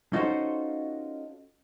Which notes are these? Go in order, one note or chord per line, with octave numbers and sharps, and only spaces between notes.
C#4 D#4 F4 F#4 A4 C5